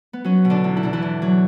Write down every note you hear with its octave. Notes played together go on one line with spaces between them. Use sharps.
B3
F#3 C#4
B2
D3 D4
E2
E4
B2 D4
E3 E4
D3
F#3